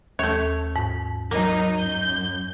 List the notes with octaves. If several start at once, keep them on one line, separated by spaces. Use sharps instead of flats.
D#2 A3 C#5
G#2
F#3 A#3 D#4
F#2 G6